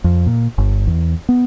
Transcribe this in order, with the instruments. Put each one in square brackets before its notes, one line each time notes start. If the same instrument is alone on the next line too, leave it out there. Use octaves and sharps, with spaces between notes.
[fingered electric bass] F2
A#2
G1
E2
B3